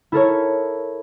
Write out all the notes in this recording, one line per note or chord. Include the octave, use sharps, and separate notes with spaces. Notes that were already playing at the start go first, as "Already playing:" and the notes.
E4 A4 A#4 C#5